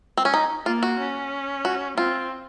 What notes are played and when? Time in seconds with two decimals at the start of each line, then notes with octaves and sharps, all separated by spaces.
0.17 C4
0.25 C#4
0.34 D#4
0.66 A#3 F4
0.83 F#4
0.99 C#4
1.65 F#4
1.98 C4 F4